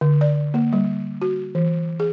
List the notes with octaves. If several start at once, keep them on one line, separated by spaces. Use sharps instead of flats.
D3
D5
A#3
G3
F#4
E3
G#4